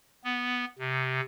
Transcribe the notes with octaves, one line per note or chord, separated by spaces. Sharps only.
B3
C3